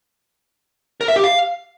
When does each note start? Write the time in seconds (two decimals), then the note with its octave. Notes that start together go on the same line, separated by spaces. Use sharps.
1.01 A#4
1.08 E5
1.16 G4
1.24 F5